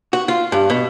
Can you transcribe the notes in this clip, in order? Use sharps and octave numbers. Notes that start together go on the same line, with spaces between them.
F#4
F4
G2
B2